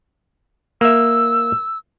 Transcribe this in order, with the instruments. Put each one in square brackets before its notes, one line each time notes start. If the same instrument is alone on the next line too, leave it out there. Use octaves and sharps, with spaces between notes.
[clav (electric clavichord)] A#3 E5 [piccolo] E6